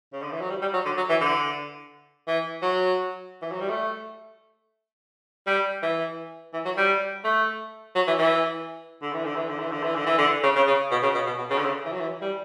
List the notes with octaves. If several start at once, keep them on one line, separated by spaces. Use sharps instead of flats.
C#3
D3
E3
F#3
G3
G3
F#3
D3
F#3
E3
D3
E3
F#3
E3
F#3
G3
A3
G3
E3
E3
F#3
G3
A3
F#3
E3
E3
D3
E3
D3
E3
D3
E3
D3
E3
D3
E3
D3
C#3
C#3
C#3
B2
C#3
B2
B2
B2
C#3
D3
C#3
E3
F#3
E3
G3